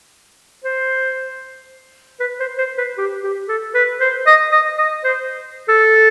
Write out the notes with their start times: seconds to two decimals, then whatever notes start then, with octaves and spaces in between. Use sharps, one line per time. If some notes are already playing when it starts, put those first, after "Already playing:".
0.65 C5
2.20 B4
2.40 C5
2.58 C5
2.78 B4
2.98 G4
3.24 G4
3.49 A4
3.75 B4
4.01 C5
4.27 D#5
4.52 D#5
4.78 D#5
5.04 C5
5.69 A4